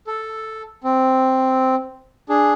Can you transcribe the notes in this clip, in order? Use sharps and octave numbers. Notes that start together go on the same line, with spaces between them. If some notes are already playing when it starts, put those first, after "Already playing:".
A4
C4
D4 G#4